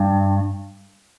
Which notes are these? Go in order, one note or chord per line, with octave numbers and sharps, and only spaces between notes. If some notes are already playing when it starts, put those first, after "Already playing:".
Already playing: G2